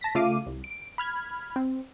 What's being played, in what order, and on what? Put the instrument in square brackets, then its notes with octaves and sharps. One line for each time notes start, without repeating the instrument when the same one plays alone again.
[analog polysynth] A5 A#6 B6
C#3 A3 F4 F5 D6 D#7
C2
D7
B5 F6 G#6
C4